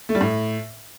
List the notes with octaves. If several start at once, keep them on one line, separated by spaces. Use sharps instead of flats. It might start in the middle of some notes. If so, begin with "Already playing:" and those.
A3
G3
A2